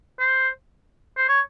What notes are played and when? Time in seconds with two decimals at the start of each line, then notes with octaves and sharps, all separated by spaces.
0.19 C5
1.17 C5
1.28 C#5